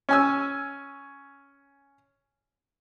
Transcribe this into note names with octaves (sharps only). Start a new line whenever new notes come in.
C#4 G#5 E6